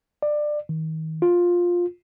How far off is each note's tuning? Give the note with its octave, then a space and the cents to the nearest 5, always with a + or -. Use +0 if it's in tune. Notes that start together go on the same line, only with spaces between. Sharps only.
D5 +20
D#3 +35
F4 +10